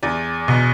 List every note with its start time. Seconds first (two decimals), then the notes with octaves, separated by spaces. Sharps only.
0.03 E2 D5
0.48 B2